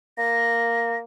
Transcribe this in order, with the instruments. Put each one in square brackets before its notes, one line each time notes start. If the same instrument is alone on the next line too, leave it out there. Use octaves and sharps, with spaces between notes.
[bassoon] A#3 [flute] A#6